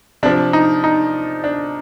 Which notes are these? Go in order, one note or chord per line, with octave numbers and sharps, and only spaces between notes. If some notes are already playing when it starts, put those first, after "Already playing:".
C3 F3 D4
D#4
D#4
D4